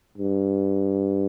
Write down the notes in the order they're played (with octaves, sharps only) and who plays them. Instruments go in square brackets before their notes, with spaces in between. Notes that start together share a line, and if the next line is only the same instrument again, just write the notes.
[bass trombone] G2